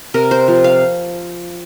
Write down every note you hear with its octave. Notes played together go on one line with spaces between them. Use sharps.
C3 A#4
C5
F3
F5